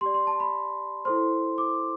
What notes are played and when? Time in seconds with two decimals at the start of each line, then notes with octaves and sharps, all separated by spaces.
0.01 G4 D5 C6
0.14 C6
0.27 A5
0.40 B5
1.05 E4 A4 C5 C6
1.58 D6